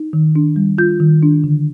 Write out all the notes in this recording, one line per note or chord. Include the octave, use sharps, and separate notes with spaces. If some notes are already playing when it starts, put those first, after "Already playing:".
Already playing: D#4
D#3
D4
G3
F4 G6
D#3
D4
D3